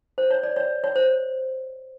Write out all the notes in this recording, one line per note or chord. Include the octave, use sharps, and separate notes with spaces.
C5
C#5
D5
C#5
C#5
C5